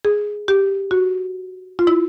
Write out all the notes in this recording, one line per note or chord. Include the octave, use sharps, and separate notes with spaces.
G#4
G4
F#4
F4
E4